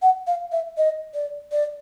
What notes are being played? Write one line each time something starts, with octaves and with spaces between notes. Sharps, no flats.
F#5
F5
E5
D#5
D5
D5